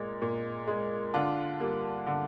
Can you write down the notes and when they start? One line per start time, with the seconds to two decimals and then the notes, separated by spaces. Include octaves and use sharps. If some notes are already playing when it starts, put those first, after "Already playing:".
Already playing: A#2 G#3
0.22 A#2
0.67 G#3
1.14 D3 D4 F4
1.60 G3 A#3
2.06 D3